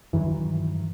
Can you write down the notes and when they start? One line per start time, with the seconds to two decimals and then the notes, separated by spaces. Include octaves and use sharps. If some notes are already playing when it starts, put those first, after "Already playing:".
0.13 G2 D#3 E3 F#3